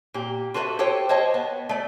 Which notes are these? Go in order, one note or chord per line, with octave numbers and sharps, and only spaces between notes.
A#2 G4
F4 F#4 A4 B4 D5 E5
G4 A4 C5 C#5 G5
C5 C#5 D#5 A5
B3
A3 D5